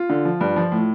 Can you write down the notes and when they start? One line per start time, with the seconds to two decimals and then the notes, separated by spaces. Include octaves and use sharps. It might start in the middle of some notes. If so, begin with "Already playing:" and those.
Already playing: F4
0.09 D3
0.25 F3
0.41 G2
0.56 F3
0.72 A2